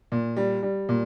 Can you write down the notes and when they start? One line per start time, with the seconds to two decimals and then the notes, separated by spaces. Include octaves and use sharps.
0.12 A#2
0.37 G3
0.63 G3
0.89 A#2